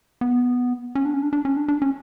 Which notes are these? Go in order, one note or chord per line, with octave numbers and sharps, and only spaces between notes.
B3
C#4
D4
C#4
D4
D4
C#4
D4
D4
C#4